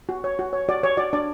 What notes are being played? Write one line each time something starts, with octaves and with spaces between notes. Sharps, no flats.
F#4
C#5
F#4
C#5
F#4 D5
C#5
F#4 D5
D4 D5